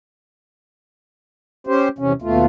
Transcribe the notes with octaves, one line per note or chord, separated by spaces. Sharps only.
C#4 G4 C5
E2 C3 C#4
D#2 B2 A3 F4